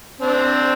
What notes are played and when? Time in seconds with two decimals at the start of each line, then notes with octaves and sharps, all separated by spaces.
0.20 C4 D4